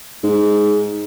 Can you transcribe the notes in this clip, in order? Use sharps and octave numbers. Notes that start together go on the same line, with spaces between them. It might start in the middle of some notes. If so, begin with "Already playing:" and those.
G#2